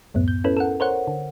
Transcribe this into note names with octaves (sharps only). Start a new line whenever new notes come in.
C#2 F#2 A2 B3
G6
C#4 E4 A4 B4
A4 A#4 F#5
A#4 C5 C#5 F#5
D3